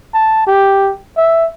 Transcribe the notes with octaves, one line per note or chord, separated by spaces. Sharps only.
A5
G4
E5